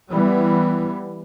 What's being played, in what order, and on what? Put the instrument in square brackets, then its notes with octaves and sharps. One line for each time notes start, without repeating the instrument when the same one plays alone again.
[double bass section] E3 G3 B3